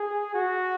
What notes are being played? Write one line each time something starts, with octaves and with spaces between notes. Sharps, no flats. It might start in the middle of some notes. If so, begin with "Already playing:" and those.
Already playing: G#4
F#4